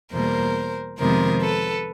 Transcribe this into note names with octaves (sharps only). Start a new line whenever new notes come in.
E2 B2 G3 A#3 A#4 C5
F2 C3 D#3 G#3 B3 A#4 C5
A4 B4